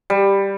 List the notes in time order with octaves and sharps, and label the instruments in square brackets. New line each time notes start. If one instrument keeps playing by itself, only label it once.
[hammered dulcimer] G3